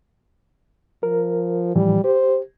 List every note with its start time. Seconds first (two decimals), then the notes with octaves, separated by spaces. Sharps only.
1.03 F3 A#4
1.75 A2 E3 F3 G3
2.04 G4 C5